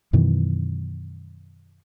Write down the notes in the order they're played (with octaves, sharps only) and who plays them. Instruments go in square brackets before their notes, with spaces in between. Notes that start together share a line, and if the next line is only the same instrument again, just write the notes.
[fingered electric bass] F#2 B2 D#3 E3